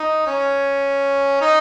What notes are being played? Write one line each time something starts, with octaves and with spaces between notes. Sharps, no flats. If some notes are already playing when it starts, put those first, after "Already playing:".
Already playing: D#4
C#4
D#4